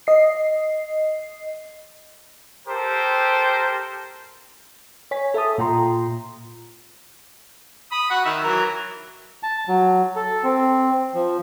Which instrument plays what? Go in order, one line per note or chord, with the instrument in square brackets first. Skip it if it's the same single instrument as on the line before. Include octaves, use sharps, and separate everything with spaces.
[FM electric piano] D#5 C7
[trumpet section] G4 A4 A#4 C5
[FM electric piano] C#5 G#5 B6
A4 E5 A5 D#6
A#2 F4 G5 A#5 C6
[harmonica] B5 D#6
F#4 F#5
D#3 E5 F6
E3 F#3 A#4
[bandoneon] A5
F#3
A4
C4
F3